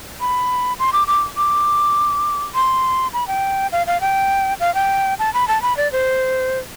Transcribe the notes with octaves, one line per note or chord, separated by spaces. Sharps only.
B5
C6
D6
D6
D6
C6
B5
G5
F5
F5
G5
F5
G5
A5
B5
A5
B5
D5
C5